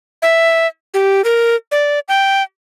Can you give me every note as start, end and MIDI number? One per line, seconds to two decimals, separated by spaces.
0.22 0.67 76
0.94 1.22 67
1.24 1.56 70
1.72 1.99 74
2.08 2.43 79